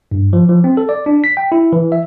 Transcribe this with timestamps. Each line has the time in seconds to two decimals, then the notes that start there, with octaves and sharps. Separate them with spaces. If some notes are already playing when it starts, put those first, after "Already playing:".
0.11 G2
0.33 F3
0.49 F3
0.64 C4
0.77 A4
0.89 D5
1.06 D4
1.24 B6
1.37 G5
1.52 E4
1.73 E3
1.92 E5